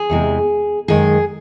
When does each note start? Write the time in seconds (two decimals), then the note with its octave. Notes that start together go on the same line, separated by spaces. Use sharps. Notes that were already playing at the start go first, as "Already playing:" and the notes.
Already playing: G#4
0.10 E2 C3 E3 G#3
0.88 F#2 D#3 G#3 G#4